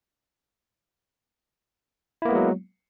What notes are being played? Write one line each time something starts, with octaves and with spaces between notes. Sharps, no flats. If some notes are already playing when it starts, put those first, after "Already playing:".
F#3 G#3 A#3 B3 E4